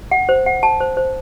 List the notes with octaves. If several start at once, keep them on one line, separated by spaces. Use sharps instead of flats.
F#5
C5
F#5
A5
C5
C5